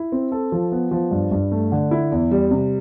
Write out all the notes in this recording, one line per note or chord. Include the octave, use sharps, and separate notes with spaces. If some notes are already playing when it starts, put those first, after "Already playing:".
Already playing: E4
C4
A4
F3
B3
F3
G2
G2
A3
D3
E4
E2
G3
C3